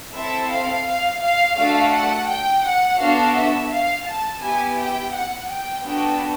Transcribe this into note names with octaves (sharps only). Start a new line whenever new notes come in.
C4 E4 A4 E5
F5
F5
F5
A3 D4 F#4 A4 F5
F#5
G5
F#5
B3 D4 F#4 A4 F5
E5
F5
A5
B3 E4 G4 G#5
G5
F#5
G5
B3 D4 F#4 A4 G5